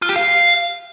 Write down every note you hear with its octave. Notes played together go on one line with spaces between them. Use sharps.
F4
G4
F5